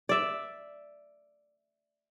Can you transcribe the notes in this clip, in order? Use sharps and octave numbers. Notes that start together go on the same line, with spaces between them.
D5 E5